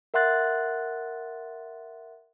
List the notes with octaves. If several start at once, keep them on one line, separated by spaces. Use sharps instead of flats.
A#4 E5 F#5 C6 F#6 A6